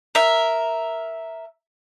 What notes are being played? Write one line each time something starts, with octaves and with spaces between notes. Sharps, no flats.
A#4 E5